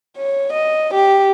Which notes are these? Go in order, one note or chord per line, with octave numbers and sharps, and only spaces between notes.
C#5
D#5
G4